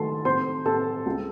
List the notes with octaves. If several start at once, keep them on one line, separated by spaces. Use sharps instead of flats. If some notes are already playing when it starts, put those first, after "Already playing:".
Already playing: D#3 A3 A4 A5 C6
C4 C5 C6
C4 A4 A5
C#2